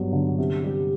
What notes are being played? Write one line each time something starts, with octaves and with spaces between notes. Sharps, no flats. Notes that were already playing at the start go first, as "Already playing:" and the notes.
Already playing: G2 F#3 B3
D3
C3
G3